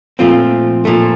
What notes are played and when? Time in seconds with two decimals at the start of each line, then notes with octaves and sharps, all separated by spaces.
0.19 A#2 F3 A3 C4 F4
0.85 A#2 F3 A3